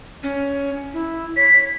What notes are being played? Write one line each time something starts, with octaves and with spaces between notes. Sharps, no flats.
C#4
E4
C#5 B6